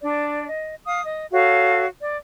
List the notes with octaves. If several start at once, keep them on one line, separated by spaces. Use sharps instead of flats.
D4 D5
D#5
F5 D#6
D#5
F#4 A4 C#5 F5
D5